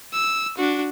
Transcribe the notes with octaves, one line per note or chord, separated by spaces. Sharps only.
E6
D4 F#4